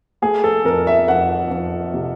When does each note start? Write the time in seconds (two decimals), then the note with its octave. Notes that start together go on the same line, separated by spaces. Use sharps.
0.22 A3 G#4
0.44 A4
0.64 F2 A#4
0.87 E5
1.08 F2 F#5
1.50 F2
1.94 C3